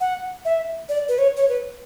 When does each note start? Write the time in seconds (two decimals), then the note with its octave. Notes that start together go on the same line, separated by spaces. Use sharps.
0.01 F#5
0.45 E5
0.89 D5
1.09 B4
1.18 C#5
1.37 C#5
1.49 B4